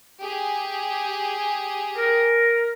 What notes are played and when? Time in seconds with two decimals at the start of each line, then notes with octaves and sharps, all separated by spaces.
0.20 G4 G#4
1.96 A#4